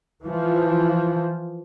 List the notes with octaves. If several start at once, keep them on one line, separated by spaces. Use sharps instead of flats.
E3 F3